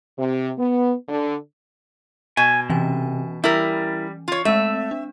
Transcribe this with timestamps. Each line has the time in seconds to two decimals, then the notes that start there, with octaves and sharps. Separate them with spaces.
0.17 C3
0.57 B3
1.08 D3
2.37 B2 G#5
2.70 C3 E3 C#4 G#5
3.44 G3 E4 A#4
4.28 F4 C#5
4.45 G#3 A3 C4 E5
4.91 D4